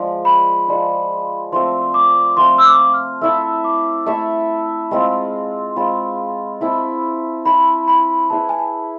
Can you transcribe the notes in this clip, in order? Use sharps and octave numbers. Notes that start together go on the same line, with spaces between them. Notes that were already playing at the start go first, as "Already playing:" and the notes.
Already playing: F3 G#3 D4
B5
F3 G#3 D4
F3 A3 C4 C6
D6
F3 A3 C4 C6
E6
D6
F6
A3 E4 A4 E5 E6
D6
A3 E4 A4 E5 A5
G#3 C4 F4
G#3 C4 F4 B5
C4 E4 A4 B5
C4 E4 A4 B5
B5
E4 G#4 B4 A5
G#5
A5